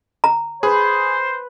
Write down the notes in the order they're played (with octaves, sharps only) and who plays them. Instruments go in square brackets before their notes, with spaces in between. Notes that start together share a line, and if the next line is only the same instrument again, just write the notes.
[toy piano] A#5
[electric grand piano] G#4 [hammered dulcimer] B4 [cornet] C5